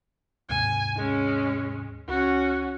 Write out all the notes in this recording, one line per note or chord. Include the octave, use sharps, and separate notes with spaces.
D#2 G#2 C3 G#5
G#3 C#4
C#2 C#4 F#4